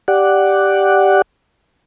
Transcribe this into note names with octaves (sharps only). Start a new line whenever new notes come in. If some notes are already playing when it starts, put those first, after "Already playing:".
G4 D5 F#5